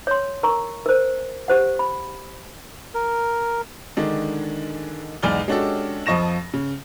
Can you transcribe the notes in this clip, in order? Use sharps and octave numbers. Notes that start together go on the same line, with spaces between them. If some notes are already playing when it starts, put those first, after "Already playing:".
C#5 C6
A#4 A#5 C#6
A#4 C5
G4 C5 F#5
B5
A#4
D3 D#3 G#3 D4
B1 E2 G#3 D5 F6 G7
G#3 C#4 D4 F#4 G4 A4
F2 F3 D#5 C#6 A#6 E7
C#3